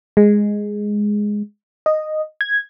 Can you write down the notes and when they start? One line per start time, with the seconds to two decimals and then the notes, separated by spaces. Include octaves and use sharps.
0.17 G#3
1.86 D#5
2.41 G#6